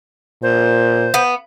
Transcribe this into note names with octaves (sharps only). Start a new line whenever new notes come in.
A#2 C5
B3